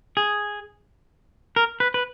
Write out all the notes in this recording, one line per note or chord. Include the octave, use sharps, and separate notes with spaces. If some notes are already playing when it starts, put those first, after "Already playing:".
G#4
A#4
B4
B4